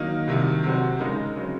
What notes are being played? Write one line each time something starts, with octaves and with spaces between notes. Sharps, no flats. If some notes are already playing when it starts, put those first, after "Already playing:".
Already playing: D#3 F#3 A#3 D#4
C2 C3 D#3 F#3
C3 F#3 C4 F#4 C5
C#3 G#3 D#4 A#4
C#3 F#3 C4